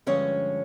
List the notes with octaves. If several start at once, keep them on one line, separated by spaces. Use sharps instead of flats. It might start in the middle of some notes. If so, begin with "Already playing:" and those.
G2 D3 F3 G#3 C#4 C#5